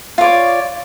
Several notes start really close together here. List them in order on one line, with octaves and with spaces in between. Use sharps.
F4 D5 C#5